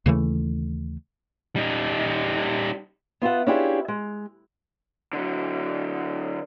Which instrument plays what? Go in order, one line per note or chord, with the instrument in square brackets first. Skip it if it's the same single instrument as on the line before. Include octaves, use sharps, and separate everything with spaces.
[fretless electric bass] D#2 C#3 E3 A3
[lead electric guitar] G3 D#4
[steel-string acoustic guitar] B3 F4 E5 F#5
C#4 D4 E4 F4 G4 G#4
G#3
[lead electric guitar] D3 F#3